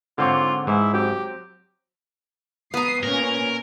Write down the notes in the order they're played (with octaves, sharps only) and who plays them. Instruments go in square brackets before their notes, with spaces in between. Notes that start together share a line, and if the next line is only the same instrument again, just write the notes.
[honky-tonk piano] G#2 D6 [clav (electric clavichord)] D3 C4 C#5 [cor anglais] F4
[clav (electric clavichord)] G#2 [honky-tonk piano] E3 [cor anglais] E4
[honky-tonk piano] F#3 C4 F#4 [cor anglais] G4
[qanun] B3 A#5 [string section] D#6 C7
[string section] A#2 C#4 [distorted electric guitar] A#4